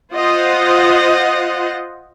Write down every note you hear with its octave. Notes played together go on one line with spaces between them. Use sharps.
F4 C5 D#5 F#5